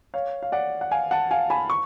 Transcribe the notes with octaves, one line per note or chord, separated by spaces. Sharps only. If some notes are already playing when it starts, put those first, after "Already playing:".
C#5 F5
F5
D5 F#5
F#5
F5 G#5
F#5 A5
F5 G#5
G#5 B5
C#6